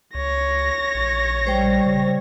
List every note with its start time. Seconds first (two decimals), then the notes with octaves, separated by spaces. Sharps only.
0.15 C#2 C#5 A#6
0.95 A#1
1.47 G3 C5 G5
1.86 C#3